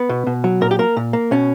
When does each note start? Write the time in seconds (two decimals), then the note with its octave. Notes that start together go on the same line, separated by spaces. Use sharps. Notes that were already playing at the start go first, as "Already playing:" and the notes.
Already playing: B3
0.09 B2
0.27 B2
0.44 F#3
0.61 A#2 A#4
0.71 G4
0.79 A#3 A#4
0.97 A#2
1.13 A#3
1.31 B2 C#4